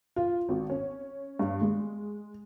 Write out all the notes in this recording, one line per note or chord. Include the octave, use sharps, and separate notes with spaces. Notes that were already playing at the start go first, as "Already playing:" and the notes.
F4
G#1
C#4
G2
G#3